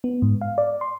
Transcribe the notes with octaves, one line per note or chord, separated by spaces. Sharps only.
B3
G#2
F5
D5
C6